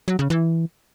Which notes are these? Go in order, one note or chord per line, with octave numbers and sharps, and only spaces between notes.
F#3
C#3
E3